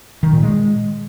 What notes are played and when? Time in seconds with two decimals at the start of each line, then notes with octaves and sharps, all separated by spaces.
0.23 D#3
0.33 A#2
0.43 G#3